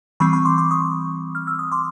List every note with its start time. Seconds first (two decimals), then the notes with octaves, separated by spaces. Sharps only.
0.20 E3 G3 C4 B5 C#6
0.33 B5 C#6
0.45 C6 D6
0.58 C6 D6
0.71 C#6 D#6
1.35 F6
1.47 E6
1.59 D#6
1.71 C6 D6